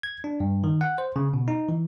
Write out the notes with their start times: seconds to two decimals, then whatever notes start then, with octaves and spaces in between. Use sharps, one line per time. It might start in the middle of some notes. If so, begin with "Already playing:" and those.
0.03 G#6
0.24 D4
0.40 G2
0.64 D#3
0.81 F#5
0.98 C5
1.16 C#3
1.34 B2
1.48 D#4
1.69 E3